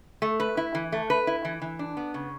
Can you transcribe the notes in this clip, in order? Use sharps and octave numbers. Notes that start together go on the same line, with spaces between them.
A3
B4
E4
E3
A3
B4
E4
E3
E3
D4
B3
C#3